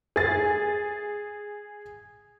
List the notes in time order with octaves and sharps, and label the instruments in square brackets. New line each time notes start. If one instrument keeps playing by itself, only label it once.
[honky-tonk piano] G#4 A6